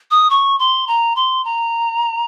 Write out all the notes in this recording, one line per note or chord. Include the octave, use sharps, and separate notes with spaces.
D#6
C#6
C6
A#5
C6
A#5